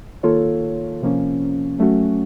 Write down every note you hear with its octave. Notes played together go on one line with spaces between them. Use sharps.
D#3 A#3 F4 A4 C#5
C3 F3 A#3 C#4
F#3 A3 C#4 F#4